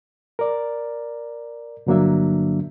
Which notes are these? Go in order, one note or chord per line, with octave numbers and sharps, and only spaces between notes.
A#4 D5
G2 D3 F#3 A#3 D4 E5